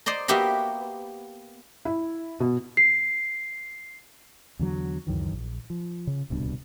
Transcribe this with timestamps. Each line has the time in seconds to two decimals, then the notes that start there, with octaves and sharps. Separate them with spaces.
0.06 C5 D5 D#5 A#5
0.28 A#3 B3 F#4 G4 E5 A#5
1.85 E4
2.40 B2
2.77 C7
4.59 E2 D3 F#3
5.07 C#2 F#2 D#3 E3
5.33 A#1
5.70 F3
6.07 C#3
6.30 D1 C2 B2 D4